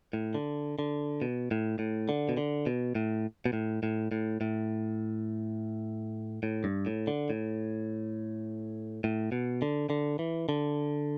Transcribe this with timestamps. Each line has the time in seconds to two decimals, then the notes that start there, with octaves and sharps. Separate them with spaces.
0.13 A2
0.35 D3
0.79 D3
1.22 B2
1.51 A2
1.79 A2
2.09 D3
2.29 B2
2.37 D3
2.66 B2
2.95 A2
3.46 B2
3.53 A2
3.83 A2
4.11 A2
4.41 A2
6.43 A2
6.64 G2
6.86 A2
7.07 D3
7.30 A2
9.04 A2
9.32 B2
9.62 D3
9.90 D3
10.19 E3
10.49 D3